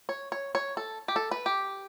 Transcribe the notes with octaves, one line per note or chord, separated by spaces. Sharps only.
C#5
C#5
C#5
A4
G4
A4
B4
G4